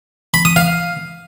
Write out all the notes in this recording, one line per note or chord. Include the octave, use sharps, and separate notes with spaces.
B5
D#6
F5